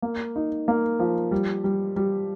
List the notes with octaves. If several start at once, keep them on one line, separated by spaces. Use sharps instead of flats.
A#3
D#4
A#3
F3
G3
G3
G3